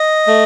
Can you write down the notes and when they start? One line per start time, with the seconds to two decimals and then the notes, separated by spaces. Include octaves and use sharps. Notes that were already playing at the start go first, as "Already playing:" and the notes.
Already playing: D#5
0.27 A3